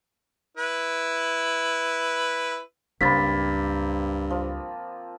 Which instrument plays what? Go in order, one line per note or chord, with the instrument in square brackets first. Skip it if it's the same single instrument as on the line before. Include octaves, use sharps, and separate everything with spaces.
[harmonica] E4 B4
[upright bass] C#2 [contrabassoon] G2 [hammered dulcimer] A#3 C4 [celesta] B5 A6 B6
[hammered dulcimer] F3